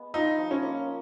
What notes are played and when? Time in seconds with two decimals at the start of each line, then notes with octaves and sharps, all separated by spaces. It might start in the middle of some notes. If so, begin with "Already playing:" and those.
Already playing: G#3 B3
0.14 F3 D#4
0.38 F3
0.51 C#4
0.63 A#3